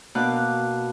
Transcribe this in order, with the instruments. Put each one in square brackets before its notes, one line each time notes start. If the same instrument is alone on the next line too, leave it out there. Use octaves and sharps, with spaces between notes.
[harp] B2 A#3 D4 F5 D6 F#6